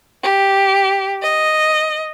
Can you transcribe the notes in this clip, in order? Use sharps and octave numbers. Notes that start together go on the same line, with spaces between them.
G4
D#5